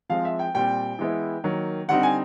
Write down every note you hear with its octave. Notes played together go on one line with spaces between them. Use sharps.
F3 G#3 C4 F5
E5
G5
A#2 G3 C4 G5
E3 G#3 B3 E4
D#3 F#3 A#3
D3 G3 C4 D#4 F#5
G#5